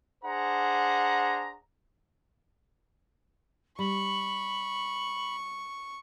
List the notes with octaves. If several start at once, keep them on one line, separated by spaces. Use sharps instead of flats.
D4 G#4 C5 F#5 A#5
G3 B5 C#6